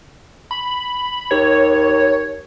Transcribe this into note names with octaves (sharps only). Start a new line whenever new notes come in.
B5
D#2 C#5